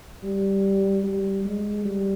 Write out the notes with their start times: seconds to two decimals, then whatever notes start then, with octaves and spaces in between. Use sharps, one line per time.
0.23 G3
1.04 G3
1.45 G#3
1.85 G3